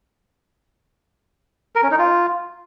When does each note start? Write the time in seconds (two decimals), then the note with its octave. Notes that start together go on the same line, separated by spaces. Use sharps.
1.75 A#4
1.83 C#4
1.91 D#4
1.99 F4